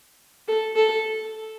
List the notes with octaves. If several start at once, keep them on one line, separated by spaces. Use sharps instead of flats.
A4
A4